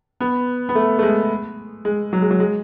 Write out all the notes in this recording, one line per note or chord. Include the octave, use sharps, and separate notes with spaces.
B3
B3
A3
A3
G#3
G#3
F#3
G#3
F#3
G#3